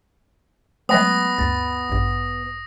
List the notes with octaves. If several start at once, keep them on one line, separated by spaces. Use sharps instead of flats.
F#3 G#3 A3 B3 D#6 A#6
D2 G2 A6
A1 G2